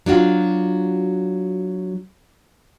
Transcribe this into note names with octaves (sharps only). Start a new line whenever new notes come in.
F#3 D4 F4 F#4